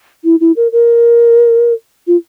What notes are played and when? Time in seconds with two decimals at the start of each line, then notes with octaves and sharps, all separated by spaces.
0.24 E4
0.41 E4
0.56 A#4
0.72 A#4
2.07 F4